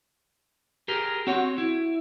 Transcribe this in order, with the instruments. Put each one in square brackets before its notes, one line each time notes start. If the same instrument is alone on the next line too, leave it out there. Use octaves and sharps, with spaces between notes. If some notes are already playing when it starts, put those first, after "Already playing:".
[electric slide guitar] G4 G#4 A#4
[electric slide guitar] C4 C#5 [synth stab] F#4
[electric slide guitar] E4